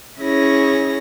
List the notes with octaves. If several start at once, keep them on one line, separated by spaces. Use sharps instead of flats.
C#4 E4 G#4 C#5 A#6